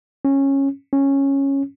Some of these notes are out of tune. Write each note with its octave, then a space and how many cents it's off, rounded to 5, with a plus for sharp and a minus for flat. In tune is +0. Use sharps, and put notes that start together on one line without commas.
C#4 -15
C#4 -10